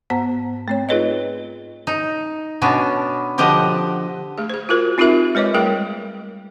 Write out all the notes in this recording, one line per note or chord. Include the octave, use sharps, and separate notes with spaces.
G#2 B3 C5 F#5 A#5
A3 C4 C#5
D#4 F4 G#4 B4 C#5 D#5
D#4
B2 B3 C#4 D4
D3 F3 G4 D#5 F#5
A3 G#4
G#4 C5
F4 F#4 G#4 A#4 C5
C4 D#4 F4 G4 A#4 E5
G#3 B4 C#5 D#5 D6
G3 A3 G#4 A#4 G5